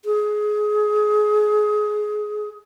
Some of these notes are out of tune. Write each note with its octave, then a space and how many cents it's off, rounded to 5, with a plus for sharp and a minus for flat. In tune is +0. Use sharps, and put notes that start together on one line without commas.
G#4 +20